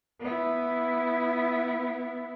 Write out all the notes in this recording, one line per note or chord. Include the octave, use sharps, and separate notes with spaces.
B3 E4